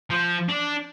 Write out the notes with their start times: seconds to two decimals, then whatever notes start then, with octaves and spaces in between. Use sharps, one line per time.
0.10 F3
0.49 D4